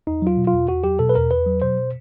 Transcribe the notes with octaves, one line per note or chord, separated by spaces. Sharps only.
E2 D#4
F#3 F4
B2
F4
E2
E2 F#4
F#3 G4
B2 A4
B4
E2 A#4
E2 B4
F#3
B2 C5